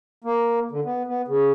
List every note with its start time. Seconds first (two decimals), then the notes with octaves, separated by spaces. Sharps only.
0.24 A#3
0.71 D3
0.85 B3
1.07 B3
1.28 C#3